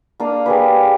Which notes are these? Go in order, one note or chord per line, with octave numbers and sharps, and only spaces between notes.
A#3 D4 F5 D#6
G4 G#4 B4